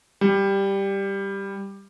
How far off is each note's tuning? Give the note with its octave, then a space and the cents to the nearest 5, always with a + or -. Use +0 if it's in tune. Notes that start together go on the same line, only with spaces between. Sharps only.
G3 +5